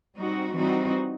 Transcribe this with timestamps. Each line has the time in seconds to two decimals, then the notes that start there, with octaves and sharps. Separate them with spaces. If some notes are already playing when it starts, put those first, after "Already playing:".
0.18 G3 C4 D#4 F#4
0.54 E3 G3 C4 D#4 F#4